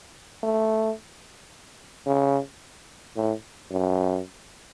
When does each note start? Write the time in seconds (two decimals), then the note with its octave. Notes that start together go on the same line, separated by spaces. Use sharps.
0.43 A3
2.07 C#3
3.16 A2
3.71 F#2